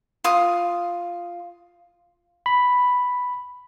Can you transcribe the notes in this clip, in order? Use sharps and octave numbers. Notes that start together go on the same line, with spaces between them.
F4 D#6
B5